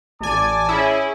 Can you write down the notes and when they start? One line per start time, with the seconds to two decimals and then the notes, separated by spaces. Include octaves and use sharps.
0.21 A1 D5 G#5 A5 D6
0.69 C#4 E4 G#4